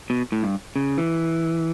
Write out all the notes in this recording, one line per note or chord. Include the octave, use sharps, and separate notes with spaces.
B2
A2
G2
C#3
E3